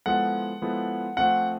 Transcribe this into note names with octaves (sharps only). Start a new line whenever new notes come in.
F3 G#3 B3 E4 A4 F#5
F3 G#3 B3 E4 A4
F3 A3 C4 F#5